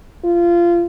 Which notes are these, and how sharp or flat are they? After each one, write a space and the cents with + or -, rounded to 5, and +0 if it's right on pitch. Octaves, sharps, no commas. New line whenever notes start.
F4 -20